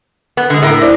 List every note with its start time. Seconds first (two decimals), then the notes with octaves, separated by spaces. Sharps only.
0.37 B3
0.50 D3 G#3
0.63 A2 A#4
0.81 E4 C5 D5